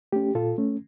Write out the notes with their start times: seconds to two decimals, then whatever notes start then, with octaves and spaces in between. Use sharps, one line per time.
0.12 A3 C#4 G4
0.35 A#2 F4 A4
0.58 A3 C#4